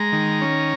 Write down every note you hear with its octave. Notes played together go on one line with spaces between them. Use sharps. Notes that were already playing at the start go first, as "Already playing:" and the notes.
Already playing: G#3 A#5
D#3
C#4